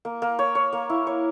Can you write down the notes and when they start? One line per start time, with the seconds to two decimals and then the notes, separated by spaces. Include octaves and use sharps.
0.05 A#3
0.22 A#3
0.39 C#5
0.55 C#5
0.73 A#3
0.90 E4
1.07 C#5